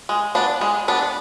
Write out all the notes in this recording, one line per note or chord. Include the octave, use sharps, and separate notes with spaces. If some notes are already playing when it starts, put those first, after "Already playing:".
G#3
B3 D4
G#3
B3 D4